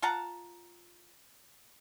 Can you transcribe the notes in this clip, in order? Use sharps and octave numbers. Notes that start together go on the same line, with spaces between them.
F4 F#5 A5 A#5